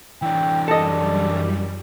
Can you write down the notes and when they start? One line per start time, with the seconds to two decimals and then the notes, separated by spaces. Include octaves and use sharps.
0.22 E3 D4 G5
0.68 F#2 G3 A4 D5 D#5